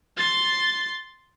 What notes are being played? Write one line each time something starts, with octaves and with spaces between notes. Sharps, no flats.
C6 A6